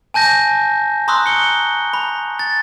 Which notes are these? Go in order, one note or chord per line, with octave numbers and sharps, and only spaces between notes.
G#5 A5 G6 A#6
A#5 C6 C#6 D#6 E6 F#6
C#7 G7
B5
A6